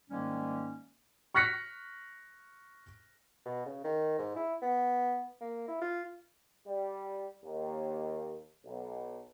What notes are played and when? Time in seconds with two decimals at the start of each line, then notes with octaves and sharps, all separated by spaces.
0.10 G#2 D#3 G3 G#3 A#3 C#4
1.35 C#6 F6 F#6 A#6 B6 C#7
3.45 B2
3.66 C#3
3.84 D#3
4.18 G#2
4.36 E4
4.62 B3
5.41 A#3
5.68 E4
5.81 F4
6.66 G3
7.44 D#2
8.64 B1